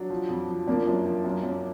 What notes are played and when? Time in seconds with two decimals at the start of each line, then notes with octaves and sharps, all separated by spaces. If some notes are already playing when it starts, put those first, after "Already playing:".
Already playing: F#3 D4
0.10 F3
0.29 F2
0.49 F3
0.67 F3 A#3 D4
0.87 F#2
1.06 F3
1.25 F#2
1.43 F#2